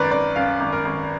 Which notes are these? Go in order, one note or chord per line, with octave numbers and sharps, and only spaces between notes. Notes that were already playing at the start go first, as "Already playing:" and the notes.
Already playing: G#1 F#2 A#4 B4 D5
G#1 D5
F#2 F5
G#1
A#4
G#1